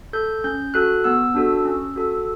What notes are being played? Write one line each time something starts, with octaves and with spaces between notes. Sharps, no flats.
A4 G6
C#4 G6
F#4 A4 F#6
B3 E6
D4 F#4 A4
C#4
F#4 A4